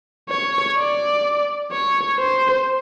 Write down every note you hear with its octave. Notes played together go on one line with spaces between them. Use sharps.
C#5
D5
C#5
C5